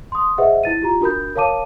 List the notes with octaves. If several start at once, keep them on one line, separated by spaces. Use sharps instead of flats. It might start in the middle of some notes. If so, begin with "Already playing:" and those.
C6 D#6
G#4 B4 C5 D#5 E5 F#5
E4 A6 D#7
F4 G4 A#5
D4 F#4 A#4 B5 G6
A#4 C#5 F5 A5 D6 D#7